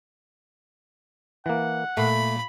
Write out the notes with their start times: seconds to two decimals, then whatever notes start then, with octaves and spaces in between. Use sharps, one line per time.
1.46 E3 A#3 F#5
1.97 A#2 A3 B5